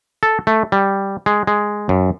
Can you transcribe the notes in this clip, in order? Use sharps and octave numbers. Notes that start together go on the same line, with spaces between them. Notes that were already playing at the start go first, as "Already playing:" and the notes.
A4
A3
G3
G#3
G#3
F#2